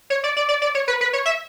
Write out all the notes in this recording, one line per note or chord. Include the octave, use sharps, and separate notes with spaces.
C#5
D5
D5
D5
D5
C#5
B4
B4
C#5
E5